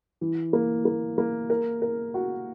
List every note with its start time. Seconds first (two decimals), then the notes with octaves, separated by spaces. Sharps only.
0.21 E3
0.53 A#3
0.85 A#3
1.18 A#3
1.50 A#4
1.82 A#4
2.14 F#4